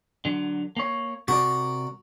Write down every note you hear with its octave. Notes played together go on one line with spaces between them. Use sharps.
D3 F#3
A#3 C#5
C3 F#4 A#4 D5